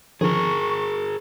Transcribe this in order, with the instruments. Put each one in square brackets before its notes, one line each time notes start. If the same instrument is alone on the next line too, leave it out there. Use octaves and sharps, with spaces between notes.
[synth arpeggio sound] D3 D#3 F3 [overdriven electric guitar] G#4 A#4 [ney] C#6